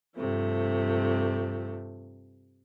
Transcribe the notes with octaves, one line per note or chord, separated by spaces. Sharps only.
G2 C3 F3 A3